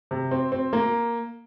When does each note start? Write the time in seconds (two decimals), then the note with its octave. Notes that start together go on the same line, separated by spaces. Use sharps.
0.11 C3
0.31 C4
0.52 C4
0.73 A#3